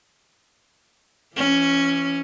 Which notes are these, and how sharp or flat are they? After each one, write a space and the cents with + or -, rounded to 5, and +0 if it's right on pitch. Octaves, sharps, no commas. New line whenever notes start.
E3 +40 C#4 +0